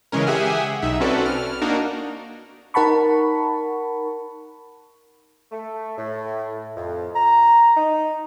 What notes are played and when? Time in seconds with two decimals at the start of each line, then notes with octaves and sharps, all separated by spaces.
0.12 C#3 E3 G#3 C#4 A#4
0.27 G4 G#4 E5 F#5 G#5
0.82 B1 D#4 E5
1.00 C4 C#4 F#4 A4 B4 D5
1.25 F6
1.61 A#3 D4 D#4 F#4 A#4
2.74 D#4 A#4 F#5 A5 B5 C#6
5.52 A3
5.98 A2
6.76 F2
7.15 A#5
7.76 D#4